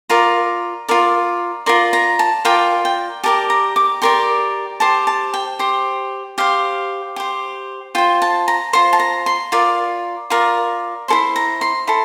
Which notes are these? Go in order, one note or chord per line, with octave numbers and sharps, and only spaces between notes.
F4 A#4 D5 A#5
F4 A#4 D5
F4 A#4 D5 C6
A#5
A5
F4 A#4 D5 G5
G5
G4 A#4 D5 A5
A#5
D6
G4 A#4 D5 C6
G4 C5 A5
A5
G5
G4 C5
G4 C5 F5
G4 C5
F4 C5 G5
A5
A#5
F4 C5 C6
A5
A#5
C6
F4 A#4 D5
F4 A#4 D5
E4 A4 C5 C6
A#5
C6
E4 A4 C6